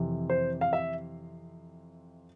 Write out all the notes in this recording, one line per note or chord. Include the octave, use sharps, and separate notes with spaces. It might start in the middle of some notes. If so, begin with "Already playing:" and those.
Already playing: F2 C3 E3
C5
F5
E5